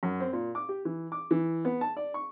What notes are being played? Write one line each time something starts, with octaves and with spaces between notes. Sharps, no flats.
F#2
C4
A#2
D6
G4
E3
D6
E3
B3
A5
D5
C#6